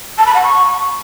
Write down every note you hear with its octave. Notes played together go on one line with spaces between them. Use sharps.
A5
B5
F#5
C#6